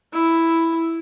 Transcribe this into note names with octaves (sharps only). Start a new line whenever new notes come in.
E4